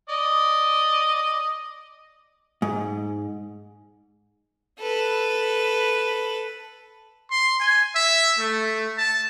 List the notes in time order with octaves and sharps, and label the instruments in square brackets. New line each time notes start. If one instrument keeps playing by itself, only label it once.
[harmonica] D5 D#5
[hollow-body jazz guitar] G#2
[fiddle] A4 B4
[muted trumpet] C6
G#5
E5
A3
A5